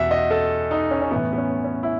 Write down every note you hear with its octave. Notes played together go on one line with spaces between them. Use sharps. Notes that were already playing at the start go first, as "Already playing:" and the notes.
Already playing: E2 B2 E5 F#5
D#5
A4
D#4
C#4
C#4
A2 E3 B3
B3
C#4
C#4
E4